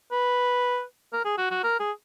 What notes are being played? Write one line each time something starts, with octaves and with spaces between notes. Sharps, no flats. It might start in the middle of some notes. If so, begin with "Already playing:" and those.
B4
A#4
G#4
F#4
F#4
A#4
G#4